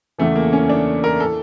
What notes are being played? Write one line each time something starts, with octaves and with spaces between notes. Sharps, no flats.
E2 C#3 E3 A3
A#3
C#4
D4
A#4
E3 A4